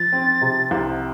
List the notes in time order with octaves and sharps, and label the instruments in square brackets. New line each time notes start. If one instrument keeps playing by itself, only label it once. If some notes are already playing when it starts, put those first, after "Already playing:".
Already playing: [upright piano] F3 [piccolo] A6
[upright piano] C4
C3
C2